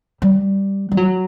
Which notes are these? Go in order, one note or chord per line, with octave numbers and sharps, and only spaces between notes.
G3
G3
F#3